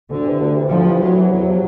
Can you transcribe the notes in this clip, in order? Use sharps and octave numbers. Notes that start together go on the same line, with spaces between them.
D2 D3
C3 E3
D2
C3 E3
D2 F3
C3 E3
D2 F#3
C3 E3
E2 F#3
C3 F3